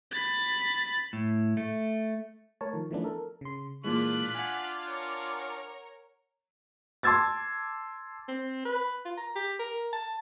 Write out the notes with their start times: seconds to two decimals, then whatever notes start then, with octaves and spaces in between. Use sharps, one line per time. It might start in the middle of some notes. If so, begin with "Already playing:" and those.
0.11 B5 A6
1.13 A2
1.57 A3
2.61 A3 A#4 C#5 A5
2.74 D#3 F3
2.91 E3 F3 A3 B3 C#4 D4
3.04 A4 A#4
3.41 C#3 C6
3.84 A#2 E3 G#3 D4 F4 D6 F#6 B6
4.35 F#5 G#5
4.88 A#4 C#5
7.03 A5 C6 D6 E6 G#6 A6
8.28 C4
8.65 B4
9.05 F4
9.17 A#5
9.35 G4
9.59 A#4
9.93 A5